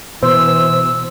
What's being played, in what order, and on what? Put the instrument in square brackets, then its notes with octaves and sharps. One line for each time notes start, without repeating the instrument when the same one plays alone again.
[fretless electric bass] B2 [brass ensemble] E3 [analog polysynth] C5 [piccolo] E6